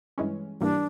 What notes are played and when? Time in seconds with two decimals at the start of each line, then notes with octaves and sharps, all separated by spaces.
0.18 G2 E3 G#3 C#4
0.61 G#2 E3 G3 A#3 D4